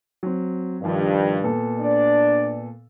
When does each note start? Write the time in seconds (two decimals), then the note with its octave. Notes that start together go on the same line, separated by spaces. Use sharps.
0.23 F#3 C4
0.82 G2 D#3 F3
1.44 A#2 B3 A4
1.79 D4 D5